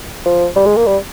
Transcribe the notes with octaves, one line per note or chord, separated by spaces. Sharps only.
F3
G3
G#3
A#3
G3